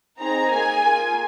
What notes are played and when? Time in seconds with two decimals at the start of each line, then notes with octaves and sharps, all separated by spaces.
0.18 C4 D#4 G#4 A#5
0.49 A#3 G#4 G#5
0.82 A#3 F4 G#4